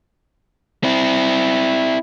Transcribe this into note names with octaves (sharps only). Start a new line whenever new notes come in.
C4 E4